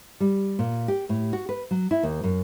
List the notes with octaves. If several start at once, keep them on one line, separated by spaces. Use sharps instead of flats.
G3
A#2
G4
A2
F#4
B4
F#3
E4
D#2
F#2